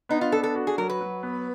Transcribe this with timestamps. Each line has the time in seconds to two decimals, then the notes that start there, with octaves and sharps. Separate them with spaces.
0.09 B3 D#4
0.21 F4
0.32 D4 A4
0.43 A4
0.55 F#4
0.67 G#4
0.78 F#3 A#4
0.90 B4
1.01 F#3
1.23 B3